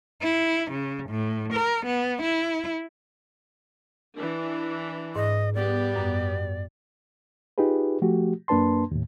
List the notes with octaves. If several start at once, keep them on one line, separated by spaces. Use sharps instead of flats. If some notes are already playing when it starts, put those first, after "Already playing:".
E4
C#3
A2
A#4
B3
E4
E3 D4
G#2 D#5
G3 B3 G4 D5
F#2
D#4 F4 G4 G#4 B4
F3 A3 F#4 G4
F#2 A#3 D4 B4 A5 C6
D#2 A2